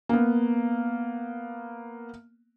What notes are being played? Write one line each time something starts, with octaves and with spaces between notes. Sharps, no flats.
A#3 B3